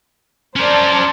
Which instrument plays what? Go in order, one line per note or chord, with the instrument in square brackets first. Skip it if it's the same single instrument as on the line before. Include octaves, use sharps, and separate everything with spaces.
[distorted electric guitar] C#4 A#4 [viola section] C5 D5 A5